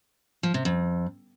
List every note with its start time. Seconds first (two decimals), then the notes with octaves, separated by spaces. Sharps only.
0.43 F3
0.54 C3
0.65 F2